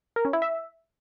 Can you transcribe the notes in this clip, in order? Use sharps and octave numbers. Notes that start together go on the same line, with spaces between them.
A#4
C#4
E4
E5